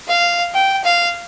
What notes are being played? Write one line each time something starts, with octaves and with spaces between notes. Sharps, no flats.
F5
G5
F5